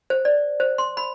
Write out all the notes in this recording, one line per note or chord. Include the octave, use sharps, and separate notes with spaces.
C5
D5
C5
C6
B5